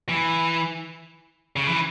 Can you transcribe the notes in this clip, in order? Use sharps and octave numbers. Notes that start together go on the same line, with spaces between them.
E3
C#3
E3